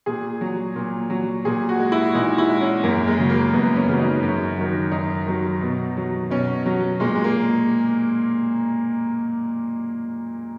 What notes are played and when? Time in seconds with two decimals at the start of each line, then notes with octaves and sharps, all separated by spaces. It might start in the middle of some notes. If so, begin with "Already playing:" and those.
0.06 A#2 G#4
0.41 F#3
0.76 A#2
1.10 F#3
1.45 A#2 G#4
1.69 F#4
1.80 G#3
1.92 E4
2.14 A#2 D#4
2.38 E4
2.50 G#3
2.61 C#4
2.83 F#2 A#3
3.07 G#3
3.18 C#3 F#3
3.30 A#3
3.53 F#2 B3
3.76 C#4
3.89 C#3 F#3
3.99 D#4
4.23 F#2
4.58 D#3 F#3
4.92 F#2 D#4
5.26 D#3 F#3
5.62 B2
5.97 F#3
6.30 B2 C#4
6.66 F#3
7.00 A#2 G#3
7.15 G#3
7.24 A#3